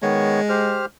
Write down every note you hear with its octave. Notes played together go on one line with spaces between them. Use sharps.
D#3 G#3 B3 C#5
G4 C5 F6